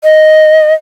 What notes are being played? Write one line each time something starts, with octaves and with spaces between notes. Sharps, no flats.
D#5